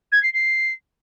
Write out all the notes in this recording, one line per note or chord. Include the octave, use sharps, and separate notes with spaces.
G#6
C7
C7